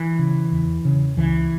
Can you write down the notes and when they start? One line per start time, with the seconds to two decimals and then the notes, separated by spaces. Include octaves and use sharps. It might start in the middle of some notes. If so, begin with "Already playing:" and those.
Already playing: E3
0.19 C#3
0.52 E2
0.85 C#3
1.17 C#2 E3